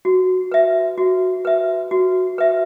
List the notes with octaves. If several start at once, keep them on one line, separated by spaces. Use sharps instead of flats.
F#4
B4 E5
F#4
B4 E5
F#4
B4 E5